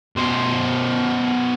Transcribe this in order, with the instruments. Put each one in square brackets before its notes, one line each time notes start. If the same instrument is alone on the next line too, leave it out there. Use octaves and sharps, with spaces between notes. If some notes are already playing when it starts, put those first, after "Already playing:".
[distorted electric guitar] B2 C5